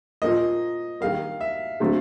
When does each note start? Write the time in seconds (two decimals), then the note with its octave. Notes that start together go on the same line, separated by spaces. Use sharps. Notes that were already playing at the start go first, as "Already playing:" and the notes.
0.22 A#2 F3 A#3 D#5
1.01 D#3 G3 A#3 F5
1.41 E5
1.80 D3 F#3 A3 C4